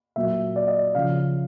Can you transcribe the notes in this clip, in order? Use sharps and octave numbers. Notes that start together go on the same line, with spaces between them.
A#2 F#3 E5
D5
D#5
C#3 F3 F5